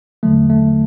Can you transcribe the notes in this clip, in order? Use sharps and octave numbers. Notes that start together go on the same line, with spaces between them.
E2 D3 F#3 A3
A3